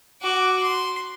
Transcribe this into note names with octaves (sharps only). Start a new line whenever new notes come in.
F#4 D6
C6